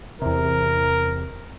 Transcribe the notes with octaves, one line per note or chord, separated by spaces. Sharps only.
E2 C3 A#4